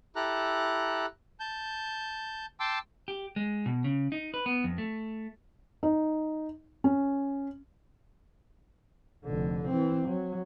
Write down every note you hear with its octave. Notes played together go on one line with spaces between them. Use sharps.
E4 G4 A4 A#5 F#6
A5 G6
G5 A5 C6 D6 E6
G4
G#3
B2
C#3
D#4
B4
B3
F2
A3
D#4
C#4
F1 D3
E3 C4
F#3